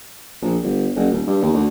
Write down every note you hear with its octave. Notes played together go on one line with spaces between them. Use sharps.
A#1
G1
F#1
D#1
G2
D#2
D2